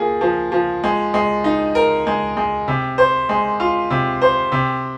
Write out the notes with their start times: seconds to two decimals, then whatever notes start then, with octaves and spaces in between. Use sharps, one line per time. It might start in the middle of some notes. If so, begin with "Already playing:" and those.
Already playing: F3 A#3 G#4
0.21 F3
0.52 F3
0.84 G#3
1.14 G#3
1.44 D#4
1.75 A#4
2.07 G#3
2.37 G#3
2.68 C3
2.98 C5
3.29 G#3
3.60 F4
3.90 C3
4.22 C5
4.52 C3